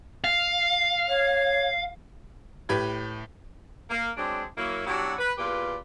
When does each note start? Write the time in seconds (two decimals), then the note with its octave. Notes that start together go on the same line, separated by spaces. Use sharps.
0.24 F5
1.09 C#5
2.69 A2 G4 B4 G#6
3.90 A#3
4.17 F#3 G#3 C4 D4
4.58 F#3 A#3 E4
4.87 B2 F#3 D4 E4 F#4 G4
5.19 B4
5.38 E2 A#2 F4 G4 B4